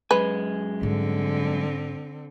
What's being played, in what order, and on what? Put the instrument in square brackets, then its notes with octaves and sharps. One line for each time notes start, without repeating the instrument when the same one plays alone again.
[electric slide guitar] F#2 G#3 G#5 [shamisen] B4
[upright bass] G#2 G3 [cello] D3 C4